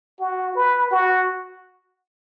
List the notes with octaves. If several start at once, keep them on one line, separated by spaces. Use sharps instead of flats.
F#4
B4
F#4